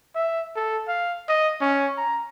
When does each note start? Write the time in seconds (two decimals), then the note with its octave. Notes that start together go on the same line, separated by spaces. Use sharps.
0.15 E5
0.56 A4
0.88 F5
1.29 D#5
1.61 C#4
1.97 A#5